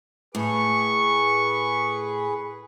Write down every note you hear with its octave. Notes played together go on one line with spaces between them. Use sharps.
A2 G#4 B4 C#6